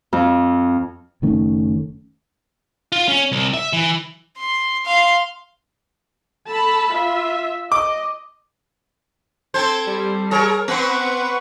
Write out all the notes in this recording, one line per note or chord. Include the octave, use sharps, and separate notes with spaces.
F2
F#1 D#3 A3 C#4
F4
C#4
C2
E5
E3
C6
F5 C6
A4 A5 B5
F4 E5
D#5 D6
C4 A4 C5 G#6
G3
G#4 A#4 C#5
B3 C4 B4 F#5 C#6